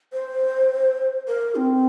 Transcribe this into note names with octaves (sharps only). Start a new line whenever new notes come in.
C5
A#4
C4